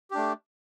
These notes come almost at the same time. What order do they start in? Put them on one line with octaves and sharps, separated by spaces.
G4 D4 A3